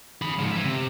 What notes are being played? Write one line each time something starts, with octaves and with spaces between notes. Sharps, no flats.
G#4 B5
G#2 F3
E5 G#5
C3